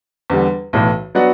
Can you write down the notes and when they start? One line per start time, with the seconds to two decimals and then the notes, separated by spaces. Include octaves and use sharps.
0.30 E2 D3 G3
0.73 B1 A2 E3
1.15 F#3 B3 D4 F#4